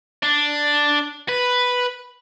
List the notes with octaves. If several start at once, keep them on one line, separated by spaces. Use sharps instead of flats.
D4
B4